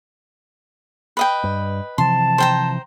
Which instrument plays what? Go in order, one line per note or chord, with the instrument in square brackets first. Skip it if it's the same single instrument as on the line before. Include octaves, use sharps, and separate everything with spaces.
[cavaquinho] B4 D#5 G5
[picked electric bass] G2
[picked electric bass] C3 E3 F3 [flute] A5 [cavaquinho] C6
[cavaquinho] C5 G5 A#5